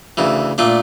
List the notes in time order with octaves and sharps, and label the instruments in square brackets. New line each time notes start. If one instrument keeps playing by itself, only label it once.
[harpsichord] D2 C#3 E3
A#2 A3 D4 F4